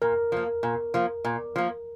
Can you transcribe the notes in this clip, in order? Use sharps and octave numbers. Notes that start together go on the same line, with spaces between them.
A#2 A#4
F3 A#3
A#2
F3 A#3
A#2
F3 A#3